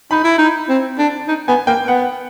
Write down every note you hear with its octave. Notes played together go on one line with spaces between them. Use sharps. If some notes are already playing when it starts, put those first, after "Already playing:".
D#4 B5
E4
D#4
C4
D4
D#4
B3 G#5
A#3 G5
B3 F#5